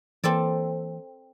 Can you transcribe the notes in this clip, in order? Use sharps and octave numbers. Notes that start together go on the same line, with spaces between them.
E3 A#3 C4 A4 D5